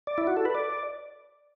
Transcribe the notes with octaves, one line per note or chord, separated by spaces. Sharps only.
D5
E4
F#4
A4
B4
D5